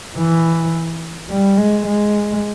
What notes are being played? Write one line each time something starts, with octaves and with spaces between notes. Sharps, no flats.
E3
G3
G#3
G#3